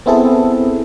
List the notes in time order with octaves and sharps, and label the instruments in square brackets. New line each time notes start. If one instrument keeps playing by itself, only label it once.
[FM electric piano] B3 C4 E4 G#4 A4